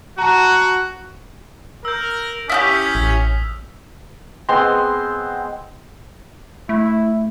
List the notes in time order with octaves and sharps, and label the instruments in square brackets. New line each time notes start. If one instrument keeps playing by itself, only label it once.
[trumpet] F#4 [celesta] A5 A#5
[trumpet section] A#4 [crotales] E6 G6
[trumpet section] C#4 [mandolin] E4 F#4 G4 [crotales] D#6 F6 B6
[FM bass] A1
[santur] G#3 B3 C4 C6
[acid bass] A3 [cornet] E4